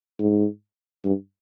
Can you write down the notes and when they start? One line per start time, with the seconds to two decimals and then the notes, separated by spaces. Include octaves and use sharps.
0.19 G#2
1.04 G2